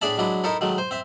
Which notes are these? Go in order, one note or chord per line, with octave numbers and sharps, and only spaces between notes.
A2 D4 G#4 D5 E5 A5
F#3 G#3 D4 E4
D#4 E4 A4 A#4 C#5
D#3 F#3 G#3 A3
C5
C4 E5